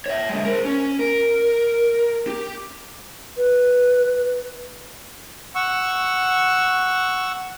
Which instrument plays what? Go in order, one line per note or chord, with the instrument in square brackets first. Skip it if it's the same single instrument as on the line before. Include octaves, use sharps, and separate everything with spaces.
[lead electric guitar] C#5 E5
D3 G#3
A#4 C5
C#4
A#4
G4
[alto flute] B4
[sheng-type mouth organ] F#5 C#6 E6